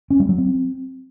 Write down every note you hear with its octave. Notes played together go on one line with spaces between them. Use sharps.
C#4
G3
F#3
C4